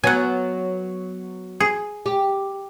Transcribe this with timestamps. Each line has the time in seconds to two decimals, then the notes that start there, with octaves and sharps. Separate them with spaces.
0.04 F#3 B3 F#5 G#5
1.60 G#4
2.06 G4